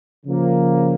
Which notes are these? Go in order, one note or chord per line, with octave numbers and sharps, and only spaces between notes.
C#3 F3 A#3